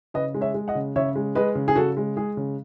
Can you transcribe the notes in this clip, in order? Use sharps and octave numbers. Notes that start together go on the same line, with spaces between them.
C#3 B4 D#5
G#3
C#5 E5
G#3
D#5 F#5
C#3
C#3 C#5 E5
G#3
G#3 B4 D#5
C#3
G#4
C#3 F#4 A4
G#3
G#3 G#4
C#3